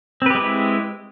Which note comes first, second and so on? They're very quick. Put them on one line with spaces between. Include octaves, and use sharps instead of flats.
C4 B4 G4 G#3 E4